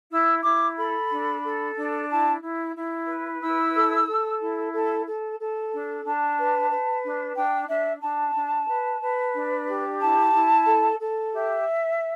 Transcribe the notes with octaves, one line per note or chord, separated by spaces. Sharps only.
E4 E6
E4 D6
A4 B5
D4
A4
D4
E4 A5
E4
E4
B4
E4 E6
A4
A4
E4
A4
A4
A4
D4
D4 A5
B4
B4
D4
D4 G5
D4 E5
D4 A5
D4
B4
B4
D4
G4
E4 A5
E4
A4
A4
G4 E5